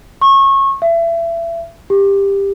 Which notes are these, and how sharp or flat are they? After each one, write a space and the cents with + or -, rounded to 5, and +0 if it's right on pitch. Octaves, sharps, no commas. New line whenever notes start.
C#6 -25
E5 +30
G4 +15